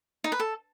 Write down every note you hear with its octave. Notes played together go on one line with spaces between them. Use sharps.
D#4
B4
A4